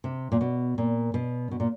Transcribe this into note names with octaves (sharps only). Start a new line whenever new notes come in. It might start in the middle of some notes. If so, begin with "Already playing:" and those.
C3
A#2
B2
A#2
B2
B2
A#2